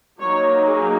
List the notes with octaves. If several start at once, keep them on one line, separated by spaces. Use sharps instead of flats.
F#3 A#3 D#4 C#5
G#4